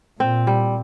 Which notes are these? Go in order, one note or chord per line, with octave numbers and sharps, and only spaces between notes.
A#2 C4
G3